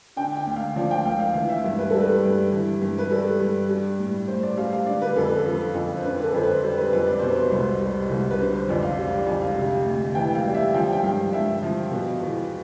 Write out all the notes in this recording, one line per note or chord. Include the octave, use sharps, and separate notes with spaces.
D3 G5
G5
D2
F5
F3 D5
G5
D2 F5
F5
E3 F5
E5
G2
B4
G3 A4
B4
G2
E3
G2
B4
G3 A4
G2
G3
A2
A2 C5
D5
G3 F5
F5
D3 D5
B4
F2 A4
A4
F3
F2
C5
D3 B4
B4
A4
F2 C5
B4
G3 C5
B4
F2 B4
D5
B2 C5
B4
C5
C2
G3
C2
B4
D3 C5
C5
F2 D5
F5
G3
D5
F2
F5
C3
D2
E3 G5
F5
G3
E5
F3 G5
G5
G2 F5
G2 E5
F3
B2
E2